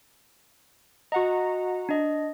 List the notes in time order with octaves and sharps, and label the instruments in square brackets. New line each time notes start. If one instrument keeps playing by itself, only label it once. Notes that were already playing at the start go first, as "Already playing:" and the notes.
[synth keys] F#4 F#5 A#5 [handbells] D#5
[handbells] D4 D#5